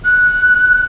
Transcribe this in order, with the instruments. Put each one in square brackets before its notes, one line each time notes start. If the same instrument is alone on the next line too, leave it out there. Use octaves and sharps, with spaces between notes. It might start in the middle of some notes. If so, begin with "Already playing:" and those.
[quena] F#6